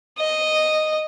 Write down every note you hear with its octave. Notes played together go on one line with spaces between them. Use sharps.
D#5